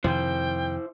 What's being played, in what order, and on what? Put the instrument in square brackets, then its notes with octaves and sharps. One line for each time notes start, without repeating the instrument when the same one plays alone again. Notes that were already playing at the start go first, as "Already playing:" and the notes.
[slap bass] F2 C3 D#3 [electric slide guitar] E4 C5 [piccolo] G5